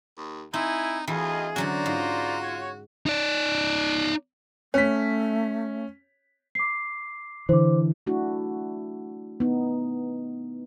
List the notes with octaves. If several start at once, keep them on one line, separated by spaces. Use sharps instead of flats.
D#2
C4 D#4 E4 G#5
D2 E3 F4 G#4 D#5
D3 F#3 C#4 F#4 C5 D5 A#5
G#2 F4
C#5
D#4 D5
A3 C#4 C#5 B6
D6 C7
D3 E3 C5 D6
A3 D4 E4 F#4
B3 D#4